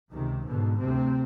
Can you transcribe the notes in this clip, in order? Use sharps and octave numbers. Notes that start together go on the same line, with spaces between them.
C#2 C3 D#3
G#2 B2 D3
D2 C3 C4